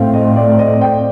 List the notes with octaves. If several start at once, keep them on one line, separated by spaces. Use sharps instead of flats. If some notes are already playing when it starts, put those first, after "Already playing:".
Already playing: A2 A3 C4 F5 G5
D#5
D5
D#5
G5